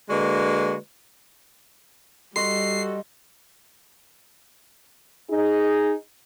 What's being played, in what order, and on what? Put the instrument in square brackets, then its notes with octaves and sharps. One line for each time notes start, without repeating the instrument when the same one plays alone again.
[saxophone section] D3 G#3 A#3 F#4 B4 D5
[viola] G3 [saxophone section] F#4 A4 [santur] D#5 C6 [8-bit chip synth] C7
[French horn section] D#4 G#4